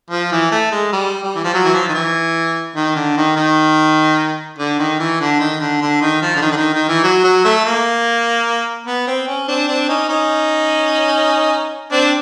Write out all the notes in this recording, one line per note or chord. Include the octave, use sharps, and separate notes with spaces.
F3
E3
A3
G#3
G3
G3
E3
F3
F#3
E3
F3
D#3
E3
D#3
D3
D#3
D#3
D3
D#3
E3
D3
D#3
D3
D3
D#3
F3
D3
D#3
D3
D#3
D#3
E3
F#3
F#3
A3
A#3
B3
C4
C#4
C4 D4
C4 D4
C#4 D#4
C#4 D#4
C4 D4